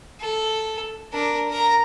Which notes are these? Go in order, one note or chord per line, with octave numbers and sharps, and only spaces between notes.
A4
D4 A#4
A#4 A#5